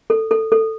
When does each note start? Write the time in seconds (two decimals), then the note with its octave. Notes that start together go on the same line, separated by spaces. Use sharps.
0.10 A4
0.31 A4
0.52 A4